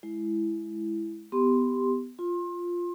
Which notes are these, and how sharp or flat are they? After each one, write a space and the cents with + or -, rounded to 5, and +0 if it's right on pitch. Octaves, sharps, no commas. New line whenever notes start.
G#3 +20 E4 +5
B3 +15 G4 +0 C6 +0
F4 +0 C6 +30